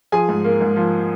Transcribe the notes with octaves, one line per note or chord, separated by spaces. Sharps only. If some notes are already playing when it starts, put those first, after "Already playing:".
F3 G#4 G#5
G#2
A#3
G#2
F3